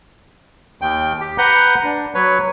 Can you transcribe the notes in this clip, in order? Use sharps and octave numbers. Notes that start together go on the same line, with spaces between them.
D#2 G5
G4
B4 F#5 A#5 G6
D4
F#3 B4 C#5